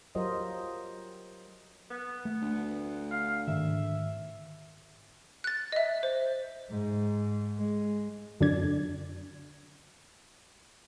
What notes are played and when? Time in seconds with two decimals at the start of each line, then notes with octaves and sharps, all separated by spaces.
0.15 F#3 F4 G4 A#4 C5 D#5
1.90 B3
2.25 A3
2.42 D2
3.11 F5
3.47 G#2 D3 D#3 E5
5.44 F#6 A6
5.72 D#5 E5
6.03 C5
6.69 G#2
7.57 G#3
8.40 F#2 D3 D4 G#6